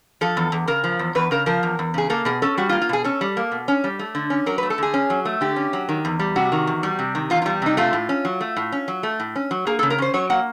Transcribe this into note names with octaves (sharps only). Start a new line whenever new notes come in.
F3 A4
E2
E2
C#3 A#4
F3
E2
E2 B4
C#3 A#4
F3 A#4
E2
E2
C#3 G#4
A#3 A4
B2 G#4
C#4 A4
G3 F#4
A#3 F4
F4
B2 G#4
C#4 A4
G3
A#3
B2
C#4
G3
A3
D3
C#4
F#3 A#4
B4
A3
A4
D3 G#4
C#4
F#3
A3
D3 G4
C#4
F#3
D#3
E2
G3
C3 F#4
D#3
E2
G3
C3
D#3
E2 F4
F4
G3
C3 D#4
A3 F4
A2
C#4
F#3
A3
A2
C#4
F#3
A3
A2
C#4
F#3
A#3 G#4
A4
C#3
A#4
C#4 C5
F#3 C#5
A#3 F#5